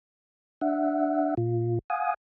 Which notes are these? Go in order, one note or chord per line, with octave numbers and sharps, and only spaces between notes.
D4 E5 F#5
A#2 F4
F5 F#5 G#5 D#6